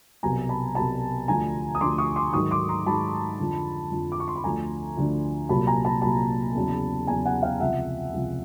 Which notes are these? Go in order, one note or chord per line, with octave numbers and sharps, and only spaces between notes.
C2 B2 F#3 G#5 A#5
A5 B5
C2 B2 F#3 A5 B5
D2 D3 F3 G#5 A#5
D#6
D2 D3 F3 C6 D6
C#6 D#6
C6 D6
G#2 D#3 F#3 C#6 D#6
C6 D6
A#5 C6
G#2 D#3 F#3 A5 B5
F2 D3 F3
F2 D3 F3
D6
C#6
C6
B5
D2 D3 F3 G#5 A#5
D2 D3 F3
C2 A#2 F#3 A5 B5
G#5 A#5
A5 B5
C2 A#2 F#3 A5 B5
E2 C#3 F#3
E2 C#3 F#3 G#5 A#5
F#5 G#5
F5 G5
C#2 C3 F3 E5 F#5
C#2 C3 F3